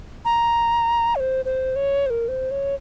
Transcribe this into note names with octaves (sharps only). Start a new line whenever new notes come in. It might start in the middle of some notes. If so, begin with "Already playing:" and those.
A#5
C#5
C5
C5
C#5
C5
A#4
C5
C#5